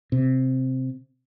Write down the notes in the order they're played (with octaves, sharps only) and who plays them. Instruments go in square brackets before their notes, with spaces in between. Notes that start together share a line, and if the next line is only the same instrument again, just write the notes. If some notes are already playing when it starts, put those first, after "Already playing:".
[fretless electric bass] C3